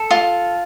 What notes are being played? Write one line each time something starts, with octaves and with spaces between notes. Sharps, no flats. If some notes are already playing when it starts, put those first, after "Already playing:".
Already playing: A4
F4